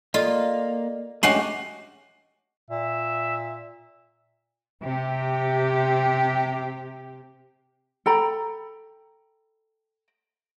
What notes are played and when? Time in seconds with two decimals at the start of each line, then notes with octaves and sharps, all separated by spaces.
0.14 A#3 F4 A4 D5 D#5
1.23 G#3 A3 C#4 F#4 G4 C7 F#7
2.70 A#2 E5
4.82 C3 G4
8.06 A4 G5 A#5 B5